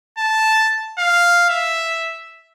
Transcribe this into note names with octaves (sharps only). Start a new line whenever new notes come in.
A5
F5
E5